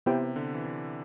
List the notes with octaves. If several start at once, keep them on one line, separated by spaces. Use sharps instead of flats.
C3 B3 E4 G4 C5 G5
D3
E3
D3